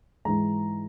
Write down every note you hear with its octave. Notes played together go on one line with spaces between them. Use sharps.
G#2 E3 G#3 A#5